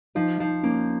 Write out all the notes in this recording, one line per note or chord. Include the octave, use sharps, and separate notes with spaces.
F3 D#4
F3 D#4
A#3 C#4